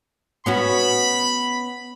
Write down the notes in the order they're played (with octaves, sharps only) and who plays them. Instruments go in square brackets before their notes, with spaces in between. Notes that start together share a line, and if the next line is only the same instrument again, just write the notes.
[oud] B3 C#4 F#4 [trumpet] B5